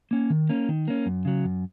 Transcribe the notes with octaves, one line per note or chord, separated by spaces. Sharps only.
A#3 C#4
D#3
A#3 C#4
D#3
A#3 C#4
F#2
C#3 F#3
F#2